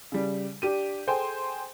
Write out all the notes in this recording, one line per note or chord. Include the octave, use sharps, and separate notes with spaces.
C#3 G3
D4 G4 D#7
G#4 A4 C5 G5 G#5